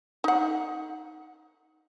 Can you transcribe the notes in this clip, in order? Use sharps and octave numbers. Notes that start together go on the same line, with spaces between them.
D#4 F#5